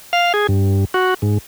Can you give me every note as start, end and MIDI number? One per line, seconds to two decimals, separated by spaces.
0.13 0.33 77
0.34 0.47 68
0.48 0.85 43
0.94 1.14 66
1.22 1.38 44